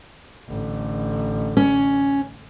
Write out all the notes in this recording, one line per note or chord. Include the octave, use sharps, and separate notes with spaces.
A1 D3
C#4